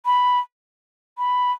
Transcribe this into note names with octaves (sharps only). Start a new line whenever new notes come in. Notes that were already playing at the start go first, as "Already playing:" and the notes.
B5
B5